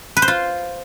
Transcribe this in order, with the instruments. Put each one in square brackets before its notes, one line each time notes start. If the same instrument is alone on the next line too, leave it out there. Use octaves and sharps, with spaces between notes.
[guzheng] B4
C5
F4